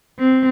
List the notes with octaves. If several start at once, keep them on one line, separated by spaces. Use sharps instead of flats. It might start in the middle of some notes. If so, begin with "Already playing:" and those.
C4